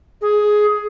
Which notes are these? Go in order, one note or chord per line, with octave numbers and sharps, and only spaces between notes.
G#4